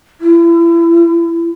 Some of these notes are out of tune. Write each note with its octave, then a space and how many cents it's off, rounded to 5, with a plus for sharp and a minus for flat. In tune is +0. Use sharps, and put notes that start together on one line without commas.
E4 +35